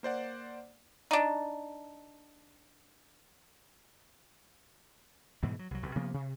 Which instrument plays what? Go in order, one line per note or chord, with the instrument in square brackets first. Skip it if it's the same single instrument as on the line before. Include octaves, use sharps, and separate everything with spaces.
[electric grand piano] A#3 C5 D5 F#5
[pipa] D4 D#4
[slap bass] G#2 B2 E3 G3
F#3
C2 F#3
B1 C3
C3 F3 A#3 B3
C3